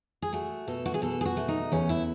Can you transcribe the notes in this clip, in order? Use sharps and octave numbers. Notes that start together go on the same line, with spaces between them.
G#4
A3 F#4
B2 A4
F#4
G#4
B2 A4
G#4
F#4
A3
D#4
E2 C#4
E4